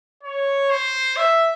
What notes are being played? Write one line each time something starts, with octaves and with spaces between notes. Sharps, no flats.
C#5
C5
E5